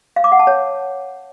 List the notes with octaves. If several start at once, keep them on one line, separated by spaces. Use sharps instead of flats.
F5
D6
F#5
A5
C#5